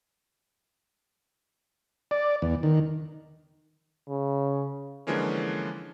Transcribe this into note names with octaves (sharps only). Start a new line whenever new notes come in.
D5
E2
D#3
C#3
D3 E3 F3 G#3 A#3 C#4